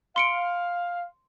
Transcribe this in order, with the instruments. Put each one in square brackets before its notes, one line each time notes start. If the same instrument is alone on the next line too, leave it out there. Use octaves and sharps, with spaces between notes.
[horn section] F5 [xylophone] C6 C#7 D7